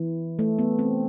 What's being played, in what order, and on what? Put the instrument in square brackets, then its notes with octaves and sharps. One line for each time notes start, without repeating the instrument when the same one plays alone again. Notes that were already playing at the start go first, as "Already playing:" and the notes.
Already playing: [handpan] E3
A3
B3
C4